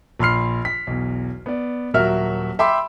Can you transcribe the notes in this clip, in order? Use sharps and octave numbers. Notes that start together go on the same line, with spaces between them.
A#1 B5 C6 F6 C7
B6
B1 E2
B3 D5
D#1 F#3 F#4 A#4 E5 F6
E5 G5 B5 C6 D6 E6